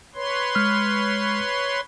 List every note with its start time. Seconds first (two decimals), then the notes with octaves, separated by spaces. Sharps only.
0.15 B4 C#5 C6
0.55 G#3 F6